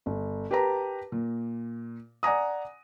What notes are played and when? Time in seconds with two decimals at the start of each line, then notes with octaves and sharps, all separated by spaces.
0.06 G1
0.51 G4 A#4 B4 A5 A#5
1.12 A#2
2.23 D5 F#5 G#5 A#5 D#6